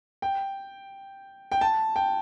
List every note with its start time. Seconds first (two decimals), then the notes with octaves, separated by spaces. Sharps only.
0.22 G5
1.52 G5
1.61 A5
1.96 G5